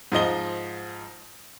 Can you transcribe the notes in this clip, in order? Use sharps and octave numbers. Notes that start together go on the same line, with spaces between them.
G#2 F3 D#5 G7